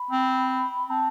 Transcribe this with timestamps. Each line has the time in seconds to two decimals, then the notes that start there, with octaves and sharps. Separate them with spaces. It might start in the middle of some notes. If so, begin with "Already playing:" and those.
Already playing: B5
0.10 C4
0.90 C4 A5